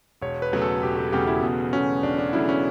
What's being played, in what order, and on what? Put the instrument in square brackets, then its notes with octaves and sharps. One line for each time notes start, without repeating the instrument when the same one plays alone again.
[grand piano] E1 [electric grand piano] C#5
[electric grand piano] B4
[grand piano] E2 C#3 F#3 A3
[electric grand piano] A4
[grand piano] E1 [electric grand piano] G4
[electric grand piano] G4
[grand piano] E2 C#3 F#3 A3 [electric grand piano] G4
[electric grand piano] E4
[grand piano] E1 [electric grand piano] B3
[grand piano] E2 C#3 F#3 A3 [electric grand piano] C#4
[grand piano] E1 [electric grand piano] D4
[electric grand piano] D4
[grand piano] E2 C#3 F#3 A3 [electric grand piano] E4
[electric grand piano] C#4